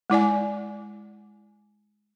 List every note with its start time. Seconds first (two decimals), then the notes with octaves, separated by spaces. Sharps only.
0.10 G#3 E4 D5 G#5